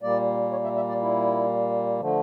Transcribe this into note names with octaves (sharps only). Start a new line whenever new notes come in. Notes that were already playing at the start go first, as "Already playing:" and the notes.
A#2 G3 A#3 D5
C#5
E5
E5
D5
E4
D3 F3 A3